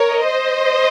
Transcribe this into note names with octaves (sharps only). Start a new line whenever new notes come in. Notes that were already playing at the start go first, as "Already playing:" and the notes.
Already playing: A#4 C#5
C5 D#5